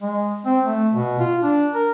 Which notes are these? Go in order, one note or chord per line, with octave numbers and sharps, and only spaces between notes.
G#3
C4
A3
B2
F4
D4
A#4